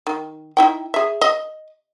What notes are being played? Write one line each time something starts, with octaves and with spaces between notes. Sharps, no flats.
D#3
D#4 E4 G5
G#4 E5
D#5